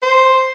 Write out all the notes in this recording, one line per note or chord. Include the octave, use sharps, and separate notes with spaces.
C5